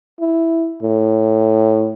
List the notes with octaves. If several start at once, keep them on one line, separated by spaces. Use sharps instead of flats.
E4
A2